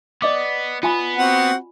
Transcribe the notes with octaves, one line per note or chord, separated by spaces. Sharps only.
B3 D5 D#5 D6
B3 F4 G#5 B5
C4 F#4 F#5